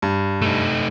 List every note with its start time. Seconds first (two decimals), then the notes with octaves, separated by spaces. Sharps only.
0.02 G2
0.42 A3 D#4